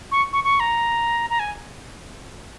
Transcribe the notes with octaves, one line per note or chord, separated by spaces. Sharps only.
C#6
C#6
C#6
A#5
A#5
G#5